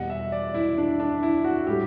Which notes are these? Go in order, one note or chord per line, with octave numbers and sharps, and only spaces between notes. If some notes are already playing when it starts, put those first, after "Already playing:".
Already playing: E2 B2 G3 F#5
E5
D5
E4
D4
D4
E4
F#4
A2 G3 G4